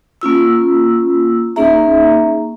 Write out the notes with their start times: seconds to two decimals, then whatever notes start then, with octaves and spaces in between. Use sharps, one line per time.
0.21 A#3 C#4 F4 E6
1.56 A#3 C#4 D#4 G#4 E5 A#5